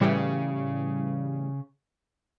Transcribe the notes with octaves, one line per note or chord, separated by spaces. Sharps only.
A2 C#3 E3 G3